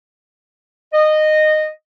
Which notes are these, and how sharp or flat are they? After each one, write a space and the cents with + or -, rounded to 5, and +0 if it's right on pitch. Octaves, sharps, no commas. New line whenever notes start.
D#5 -15